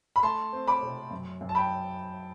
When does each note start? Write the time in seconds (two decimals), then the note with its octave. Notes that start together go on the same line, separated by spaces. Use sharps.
0.16 B5
0.23 A3 A5 C6
0.53 C4
0.67 B5 D6
0.82 C3
1.11 F#2
1.41 F#2
1.49 A5
1.55 G5 B5